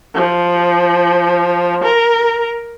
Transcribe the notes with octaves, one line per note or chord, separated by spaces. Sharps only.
F3
A#4